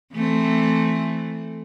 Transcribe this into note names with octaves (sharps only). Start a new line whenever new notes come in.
E3 A3 C4